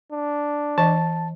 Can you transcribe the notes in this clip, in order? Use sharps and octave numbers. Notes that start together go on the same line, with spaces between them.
D4
E3 D#5 A5